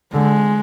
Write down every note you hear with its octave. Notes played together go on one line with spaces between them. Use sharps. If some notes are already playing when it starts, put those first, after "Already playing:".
D3 G#3